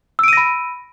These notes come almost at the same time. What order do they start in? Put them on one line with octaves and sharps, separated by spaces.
E6 D7 D#7 A#6 B5